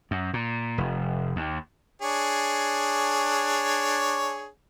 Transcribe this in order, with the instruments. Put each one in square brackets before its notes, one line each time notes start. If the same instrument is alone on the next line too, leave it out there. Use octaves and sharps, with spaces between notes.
[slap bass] F#2
A#2
F1
D#2
[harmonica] D4 G#4 C#5